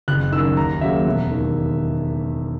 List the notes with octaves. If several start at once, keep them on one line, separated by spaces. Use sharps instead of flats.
F#1 F#6
F#2 D#3 E6
D#2 A#5
C#3 F#3 A#3 E5
E1
D#2 D#3